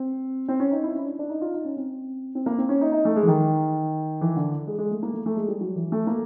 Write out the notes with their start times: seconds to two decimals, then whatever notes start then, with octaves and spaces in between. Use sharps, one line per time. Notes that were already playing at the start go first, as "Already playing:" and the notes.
Already playing: C4
0.48 C4
0.60 C#4
0.71 D#4
0.84 E4
0.95 C#4
1.06 D4
1.19 D4
1.29 D#4
1.41 F4
1.54 D#4
1.65 C#4
1.77 C4
2.35 C4
2.46 A#3
2.58 C4
2.69 C#4
2.81 D#4
2.92 D#4
3.05 A3
3.16 G#3
3.23 E3
3.27 D#3
4.21 E3
4.37 D3
4.67 G#3
4.78 G#3
4.91 A3
5.03 A#3
5.14 A3
5.26 A3
5.37 G#3
5.48 G3
5.61 F#3
5.76 E3
5.92 A3
6.07 A#3